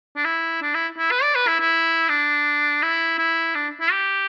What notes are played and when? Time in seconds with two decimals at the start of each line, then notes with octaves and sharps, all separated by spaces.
0.16 D4
0.25 E4
0.62 D4
0.74 E4
0.98 E4
1.11 B4
1.23 D5
1.35 B4
1.47 E4
1.60 E4
2.09 D4
2.82 E4
3.19 E4
3.55 D4
3.81 E4
3.92 G4